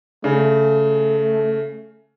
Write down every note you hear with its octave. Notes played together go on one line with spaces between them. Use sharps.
C#3 A3